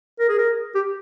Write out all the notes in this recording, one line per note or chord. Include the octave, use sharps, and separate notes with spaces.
A#4
G#4
A#4
G4